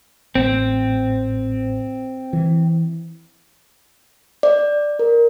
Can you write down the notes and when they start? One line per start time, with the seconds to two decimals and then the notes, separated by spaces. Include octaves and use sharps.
0.35 A1 C4
2.33 E3
4.43 D5
4.99 A#4